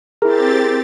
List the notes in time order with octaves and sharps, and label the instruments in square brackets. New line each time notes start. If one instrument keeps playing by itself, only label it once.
[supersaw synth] C4 G4 A6 [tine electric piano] E4 A#4 [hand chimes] G#4